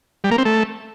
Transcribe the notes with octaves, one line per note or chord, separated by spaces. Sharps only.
G3
A#3
C4
A3